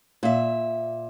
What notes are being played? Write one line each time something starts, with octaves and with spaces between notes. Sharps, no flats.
A#2 E5